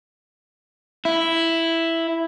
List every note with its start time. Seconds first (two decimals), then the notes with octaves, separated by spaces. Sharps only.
1.05 E4